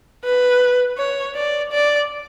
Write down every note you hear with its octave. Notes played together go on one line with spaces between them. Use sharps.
B4
C#5
D5
D5